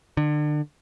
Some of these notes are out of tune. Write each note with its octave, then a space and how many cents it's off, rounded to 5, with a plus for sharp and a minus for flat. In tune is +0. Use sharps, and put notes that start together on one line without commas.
D3 +30